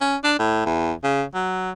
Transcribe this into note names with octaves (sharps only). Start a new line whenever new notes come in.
C#4
D4
A2
E2
C#3
F#3